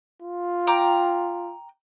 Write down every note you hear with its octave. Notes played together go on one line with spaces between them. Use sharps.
F4
G5 A#5 D6